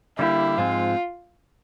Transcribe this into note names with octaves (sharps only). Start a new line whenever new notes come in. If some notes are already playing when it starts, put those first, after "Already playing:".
D3 G3 A#3 D#4 E4 G4
G#2 F3 G#3 C4 F4